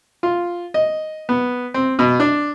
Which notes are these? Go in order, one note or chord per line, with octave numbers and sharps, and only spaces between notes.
F4
D#5
B3
C4
B2
D4